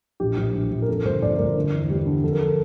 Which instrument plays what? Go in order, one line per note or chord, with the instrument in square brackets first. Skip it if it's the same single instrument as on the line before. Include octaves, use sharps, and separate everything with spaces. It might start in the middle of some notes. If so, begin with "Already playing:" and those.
[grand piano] A#1 G4
A#1
A#1
A#1
A#4
F2 A4
G1 C5
G1 D5
C5
G1 A#4
C5
D3
E2
G3
D3
F2 A4
A#4
A4